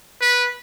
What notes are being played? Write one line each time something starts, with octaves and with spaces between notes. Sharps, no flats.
B4